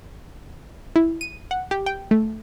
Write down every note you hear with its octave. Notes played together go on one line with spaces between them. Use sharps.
E4
D#7
F#5
G4
G5
A3